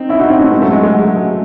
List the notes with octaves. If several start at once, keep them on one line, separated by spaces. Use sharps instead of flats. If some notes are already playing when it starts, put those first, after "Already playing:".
Already playing: C4 D#4
C#4 E4
D#4 F#4
C4 D#4
A3 C#4
G#3 C4
F#3 A3
G#3
G#3
F#3
G#3